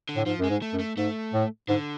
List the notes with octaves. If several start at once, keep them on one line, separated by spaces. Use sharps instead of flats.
D3
A2
G#2 F3
F#2 G#3
G#2
A3
F#2
A3
G#2 A3
A2
G#2 D3